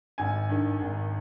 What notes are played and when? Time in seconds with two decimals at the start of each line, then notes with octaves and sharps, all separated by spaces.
0.18 G#1 G#5
0.49 G2 D#3
0.80 G#1